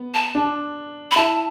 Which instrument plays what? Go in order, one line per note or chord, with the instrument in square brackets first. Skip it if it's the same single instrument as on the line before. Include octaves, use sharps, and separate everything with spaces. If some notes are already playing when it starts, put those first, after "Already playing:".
Already playing: [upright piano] B3
[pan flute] A5
[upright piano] D4
[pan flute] B5
[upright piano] E4 [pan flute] A5